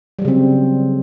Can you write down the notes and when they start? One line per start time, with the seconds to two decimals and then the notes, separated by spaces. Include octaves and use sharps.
0.19 G3
0.22 F#3
0.25 C#3
0.28 C4